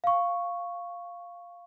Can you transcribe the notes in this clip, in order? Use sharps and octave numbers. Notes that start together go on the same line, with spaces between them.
F5 C#6